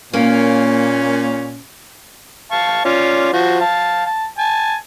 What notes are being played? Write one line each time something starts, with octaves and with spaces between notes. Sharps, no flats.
A#2 A#3 C#4
F5 A5 C#6
C#4 F4 D5
F3 F#4
F5 A5
A5
G#5 A5